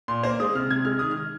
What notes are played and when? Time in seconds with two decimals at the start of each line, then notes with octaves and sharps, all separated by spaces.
0.08 A#2 C6
0.23 A#3 C5
0.40 G#3 D#6
0.55 C3 F6
0.70 C3 G#6
0.85 G#3 F6
0.99 D#3 D#6
1.11 F6
1.17 D#3